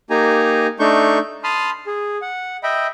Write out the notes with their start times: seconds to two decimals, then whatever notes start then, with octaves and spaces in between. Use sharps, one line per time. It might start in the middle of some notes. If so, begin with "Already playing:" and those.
0.10 A#3 D#4 G4 G#5 A#5
0.80 A3 D4 D#4 C#6 G6
1.44 A5 B5 C6 D#6 F6
1.87 G#4
2.22 F#5
2.63 D#5 E5 G5 B5